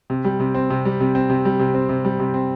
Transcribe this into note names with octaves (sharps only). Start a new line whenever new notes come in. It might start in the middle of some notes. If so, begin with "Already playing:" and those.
C3
G3
C3
C4
C3
G3
C3
C4
C3
G3
C3
C4
C3
G3
C3
C4